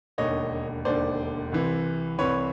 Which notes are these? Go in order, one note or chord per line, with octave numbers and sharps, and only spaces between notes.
E1 D#2 D3 C#5 D#5
E1 D#2 D3 C5 D5
C2 C3 E3
C2 C3 E3 B4 C#5